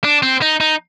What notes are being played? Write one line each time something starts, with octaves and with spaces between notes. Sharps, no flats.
D4
C4
D#4
D#4